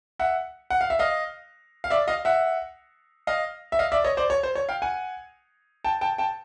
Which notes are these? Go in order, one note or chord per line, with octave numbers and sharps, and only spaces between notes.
E5 F#5
F#5
F5
E5
D#5 F5
F5
D5 E5
D#5 F5
E5 F#5
D#5 F5
E5
D#5 F5
D5 E5
C#5 D#5
C5 D5
C#5
C5
C#5
F5 G5
F#5 G#5
G5 A5
G5 A5
G5 A5